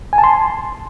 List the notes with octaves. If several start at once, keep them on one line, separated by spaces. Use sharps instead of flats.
G#5
A5
C6